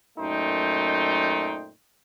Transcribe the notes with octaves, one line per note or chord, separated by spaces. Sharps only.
F#2 A#2 A3 D#4 C5 G5